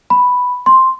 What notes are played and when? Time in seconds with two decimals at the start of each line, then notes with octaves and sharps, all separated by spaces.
0.10 B5
0.66 C6